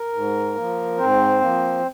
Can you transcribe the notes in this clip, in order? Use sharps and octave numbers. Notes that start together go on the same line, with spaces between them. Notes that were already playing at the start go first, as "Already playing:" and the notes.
Already playing: A#4
G#2
F3 A#3
G#2 C4 C5
F3 A#3